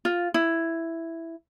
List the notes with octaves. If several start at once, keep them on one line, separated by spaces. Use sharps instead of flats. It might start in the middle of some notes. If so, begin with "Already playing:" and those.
F4
E4